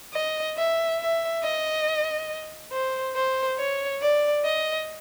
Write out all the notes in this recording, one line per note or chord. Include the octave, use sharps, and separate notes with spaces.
D#5
E5
E5
D#5
C5
C5
C#5
D5
D#5